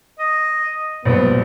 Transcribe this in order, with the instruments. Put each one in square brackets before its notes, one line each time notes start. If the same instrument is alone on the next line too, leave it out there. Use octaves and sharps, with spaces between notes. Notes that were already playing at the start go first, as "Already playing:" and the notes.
[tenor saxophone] D#5
[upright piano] A#1 G2 [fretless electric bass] B2 [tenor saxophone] B3